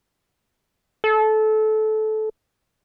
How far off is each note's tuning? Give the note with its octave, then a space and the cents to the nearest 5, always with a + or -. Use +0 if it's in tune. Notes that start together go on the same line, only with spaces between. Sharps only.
A4 -20